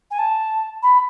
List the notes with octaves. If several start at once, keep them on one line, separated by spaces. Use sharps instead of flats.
G#5
A5
B5